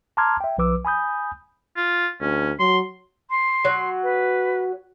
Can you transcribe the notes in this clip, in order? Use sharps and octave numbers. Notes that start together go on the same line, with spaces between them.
A5 A#5 C6 D6 F6 G#6
E5 G5
B1 F3 B4 D6 E6
G#5 B5 D#6 G6
F4
D2 C#4
F#3 C6
C6
F#3
B4